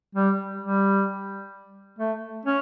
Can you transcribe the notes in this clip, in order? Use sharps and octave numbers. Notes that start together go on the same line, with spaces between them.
G3
G3
A3
C#4